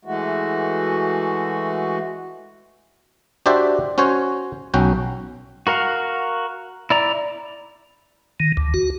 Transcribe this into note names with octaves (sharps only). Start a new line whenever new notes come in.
E3 G#3 A3 F#4
D4 F#4 G4 C5 D5 E5
C#4 F#4 C5 C#5
B1 C#4 F#4 G5
F#4 A#4 F5 F#5
E4 D5 A#5
D#3
D2
F#4